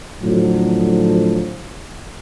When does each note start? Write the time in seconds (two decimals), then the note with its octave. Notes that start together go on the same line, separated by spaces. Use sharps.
0.20 A2 D3 F3 F#3